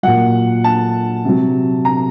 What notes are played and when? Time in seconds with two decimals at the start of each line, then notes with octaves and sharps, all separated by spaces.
0.03 A#2 F#3 F#5
0.64 A5
1.25 C3 F#3
1.85 A#5